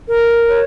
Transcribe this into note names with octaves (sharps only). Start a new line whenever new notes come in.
A#4
C#5